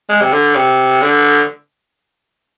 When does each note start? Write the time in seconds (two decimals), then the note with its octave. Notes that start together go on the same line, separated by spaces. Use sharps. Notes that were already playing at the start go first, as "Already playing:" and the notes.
0.09 G#3
0.21 C3
0.32 D3
0.55 C3
1.02 D3